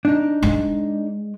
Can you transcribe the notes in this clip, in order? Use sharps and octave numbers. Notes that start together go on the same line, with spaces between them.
D4 D#4
G#3